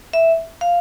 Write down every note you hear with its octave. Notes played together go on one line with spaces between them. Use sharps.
E5
F5